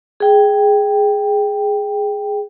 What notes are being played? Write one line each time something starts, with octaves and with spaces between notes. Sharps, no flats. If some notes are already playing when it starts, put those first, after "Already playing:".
G#4 G5